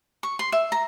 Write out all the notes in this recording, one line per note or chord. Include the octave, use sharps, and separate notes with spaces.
C#6
C6
E5
A#5